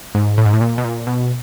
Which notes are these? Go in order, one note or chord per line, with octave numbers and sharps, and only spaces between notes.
G#2
A2
G#2
A2
A#2
B2
A#2
B2